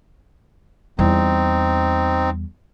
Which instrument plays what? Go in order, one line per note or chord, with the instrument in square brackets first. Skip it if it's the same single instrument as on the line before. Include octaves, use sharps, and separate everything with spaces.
[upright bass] E2 G3 [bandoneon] C4 D#4